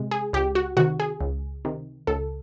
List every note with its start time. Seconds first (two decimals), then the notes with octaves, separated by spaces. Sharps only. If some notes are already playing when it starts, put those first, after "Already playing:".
Already playing: C3 G#3
0.11 G#4
0.33 C#2 G4
0.55 F#4
0.77 C3 D#3 F#4
1.00 G#4
1.21 C#2
1.65 C3 D#3
2.07 C#2 A4